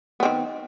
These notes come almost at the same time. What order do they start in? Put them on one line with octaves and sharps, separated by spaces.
B3 C4 D#3